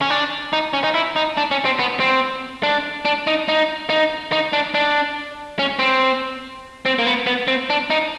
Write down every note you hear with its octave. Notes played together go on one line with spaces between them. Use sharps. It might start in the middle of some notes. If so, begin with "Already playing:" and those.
C#4
D4
D#4
C#4
D#4
E4
D#4
D4
C#4
C4
B3
C4
D4
D4
D#4
D#4
D#4
D#4
D4
D4
C#4
C4
C4
A#3
B3
B3
C4
D4
D#4